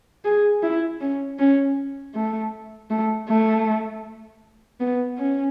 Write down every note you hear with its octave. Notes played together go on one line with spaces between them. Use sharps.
G#4
E4
C#4
C#4
A3
A3
A3
B3
C#4